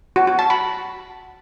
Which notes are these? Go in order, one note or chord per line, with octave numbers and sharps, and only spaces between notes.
F#4
F#4
A5
B5